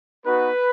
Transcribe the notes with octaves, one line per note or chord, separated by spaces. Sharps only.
B3 D#4 F#4 B4